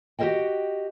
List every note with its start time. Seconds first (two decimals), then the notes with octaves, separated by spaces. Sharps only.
0.19 F#4 G4 A#4 C5 D#5 G5